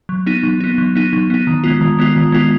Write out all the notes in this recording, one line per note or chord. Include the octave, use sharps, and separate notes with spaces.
F#3
B3 D#4
F#3
B3 D#4
F#3
B3 D#4
F#3
B3 D#4
D#3
G#3 B3 F4
D#3
G#3 B3 F4
D#3
G#3 B3 F4